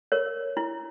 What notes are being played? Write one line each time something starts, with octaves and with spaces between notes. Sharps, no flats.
A#4 C#5
E4